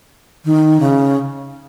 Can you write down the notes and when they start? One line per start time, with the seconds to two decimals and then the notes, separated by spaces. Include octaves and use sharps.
0.45 D#3
0.80 C#3